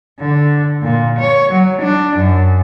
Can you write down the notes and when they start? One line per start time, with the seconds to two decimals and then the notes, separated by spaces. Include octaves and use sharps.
0.19 D3
0.83 A#2
1.19 C#5
1.52 F#3
1.82 D4
2.17 F#2